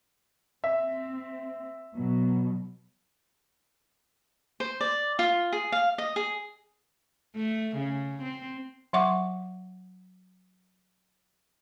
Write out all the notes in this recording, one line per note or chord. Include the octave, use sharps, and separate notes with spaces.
C4 E5
B2 F#3
C5
D5
F4
G#4
F5
D#5
G#4
A3
C#3
C4
F#3 E5 F#5 C#6 D6